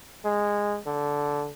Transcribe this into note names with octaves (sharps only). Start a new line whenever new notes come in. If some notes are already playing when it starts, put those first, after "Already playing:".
G#3
D3